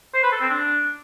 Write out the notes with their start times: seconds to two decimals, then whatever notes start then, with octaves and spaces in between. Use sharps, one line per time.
0.14 C5
0.23 B4
0.32 A4
0.41 C4
0.49 D4